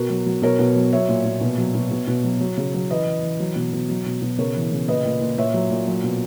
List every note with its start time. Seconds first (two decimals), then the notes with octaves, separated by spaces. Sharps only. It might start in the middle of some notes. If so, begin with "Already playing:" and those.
Already playing: B2 F#4 A#4
0.10 F#3
0.26 F#3
0.42 B2 A#4 C#5
0.59 B2
0.76 F#3
0.93 F#3 C#5 E5
1.09 A#2
1.25 A#2
1.41 B2
1.58 F#3
1.75 B2
1.91 B2
2.07 B2
2.24 F#3
2.41 F#3
2.57 C#3
2.74 F#3
2.90 E3 B4 D#5
3.06 E3
3.23 E3
3.40 F#3
3.56 B2
3.73 B2
3.89 F#3
4.06 B2
4.22 B2
4.38 C#3 A#4 C#5
4.56 E3
4.72 C#3
4.88 A#2 B4 D#5
5.05 A#2
5.21 A#2
5.37 A#2 C#5 E5
5.54 F#3
5.71 A#2
5.87 F#3
6.04 B2